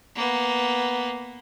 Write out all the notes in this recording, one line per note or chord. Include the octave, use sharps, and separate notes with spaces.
A#3 B3